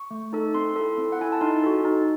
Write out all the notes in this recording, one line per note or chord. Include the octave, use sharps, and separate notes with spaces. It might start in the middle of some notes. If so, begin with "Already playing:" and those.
Already playing: C#6
A3
D#4 A4
C4 C6
E4 A4
C4
F#5
E4 A4 G#5
A5
D#4 C6
F#4 A4
D#4